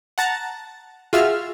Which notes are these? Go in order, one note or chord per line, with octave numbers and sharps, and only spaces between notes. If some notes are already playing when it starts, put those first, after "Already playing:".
F#5 A5 A#5 A6
F4 F#4 G#4 E5 E6 F6